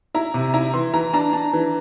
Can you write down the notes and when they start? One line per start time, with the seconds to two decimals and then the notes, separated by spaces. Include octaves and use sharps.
0.14 E4 A#5
0.34 C3
0.54 E4 A#5
0.74 E3 C6
0.94 E3 A#5
1.13 D4 A#5
1.33 D4
1.53 E3